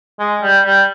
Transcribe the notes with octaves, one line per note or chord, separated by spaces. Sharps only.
G#3
G3
G3